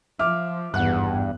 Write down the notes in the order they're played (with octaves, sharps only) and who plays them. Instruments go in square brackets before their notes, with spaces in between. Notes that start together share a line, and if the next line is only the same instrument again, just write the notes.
[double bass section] F3 [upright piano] E5 D6 F6
[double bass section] G#1 E2 E3 [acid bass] G2 [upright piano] F#5 F#6